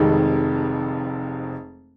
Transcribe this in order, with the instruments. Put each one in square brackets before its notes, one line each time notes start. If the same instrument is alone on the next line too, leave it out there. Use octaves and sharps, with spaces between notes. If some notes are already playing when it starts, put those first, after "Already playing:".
Already playing: [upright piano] F1 F2 C3 D#3 G#3